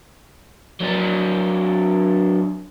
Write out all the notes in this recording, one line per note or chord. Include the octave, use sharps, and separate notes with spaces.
F#3 D4